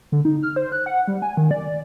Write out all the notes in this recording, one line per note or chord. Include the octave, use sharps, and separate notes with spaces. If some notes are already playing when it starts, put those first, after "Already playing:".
D3
D#4
F6
C5
F#6
F#5
G3
G#5
D#3
D5